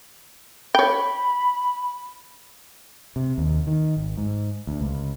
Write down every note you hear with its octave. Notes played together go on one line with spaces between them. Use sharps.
C#5 G5 B5
C3
D#2
D#3
G#1
G#2
D2
C#2